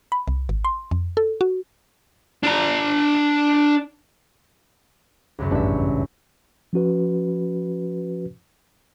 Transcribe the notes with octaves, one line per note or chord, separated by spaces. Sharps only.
B5
C2
G#1
C6
F2
A4
F#4
D4 A#5
C#2 F#2 C#3
A1 G2 C#3 D4 E5
F3 C#4 F#4 B4